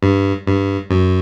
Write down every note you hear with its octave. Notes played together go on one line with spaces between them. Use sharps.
G2
G2
F#2